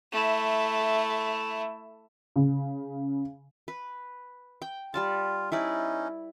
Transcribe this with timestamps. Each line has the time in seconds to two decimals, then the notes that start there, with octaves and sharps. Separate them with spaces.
0.12 A3 E4
2.36 C#3
3.68 B4
4.62 G5
4.94 G3 F4 D5 A5
5.52 C#4 D#4 E4 B4 D5